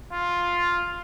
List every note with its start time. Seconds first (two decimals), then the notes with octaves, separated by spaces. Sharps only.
0.12 F4